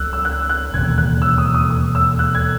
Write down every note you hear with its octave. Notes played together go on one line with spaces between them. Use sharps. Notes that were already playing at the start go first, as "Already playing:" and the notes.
Already playing: C#2 F#3 E6 F#6
E6
F#6
F#6
E1 D#2 C#3 G#6
F#6
E6
D#6
D#6
D#6
E6
F#6
G#6